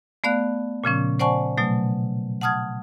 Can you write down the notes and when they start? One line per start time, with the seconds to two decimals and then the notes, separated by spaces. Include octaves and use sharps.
0.24 A3 B3 D5 F5 F#6
0.84 A#2 C#3 F3 C#4
1.20 C5 D5 F#5 G#5 A5 C#6
1.57 B2 F#3 A3
2.41 F#5 A5 D#6 F6 G#6